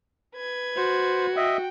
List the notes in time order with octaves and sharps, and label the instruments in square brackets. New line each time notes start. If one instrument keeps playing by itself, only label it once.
[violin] B4 G#6
[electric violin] F#4 [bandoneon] C5
[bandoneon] D#5 E5 [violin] G5